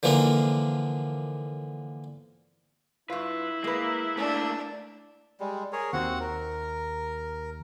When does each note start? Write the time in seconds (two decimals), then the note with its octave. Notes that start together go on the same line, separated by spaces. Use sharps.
0.03 D3 E3 F3 A#3 D4
3.10 G2 E4 F4 B4
3.64 G#3 A#3 B4
4.17 A3 A#3 D4
5.40 G3 G#3
5.72 G#4 A#4 C#5
5.93 D#2 C4 F#4 F#5
6.20 A#4